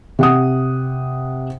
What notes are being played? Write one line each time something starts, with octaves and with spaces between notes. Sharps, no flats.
C3 F#5 D#6